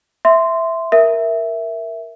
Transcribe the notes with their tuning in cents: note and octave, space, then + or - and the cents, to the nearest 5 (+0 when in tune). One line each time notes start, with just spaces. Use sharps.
E5 +0 C6 -10
A#4 +0 E5 +0